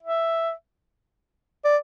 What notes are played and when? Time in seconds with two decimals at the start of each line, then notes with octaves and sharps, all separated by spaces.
0.03 E5
1.65 D5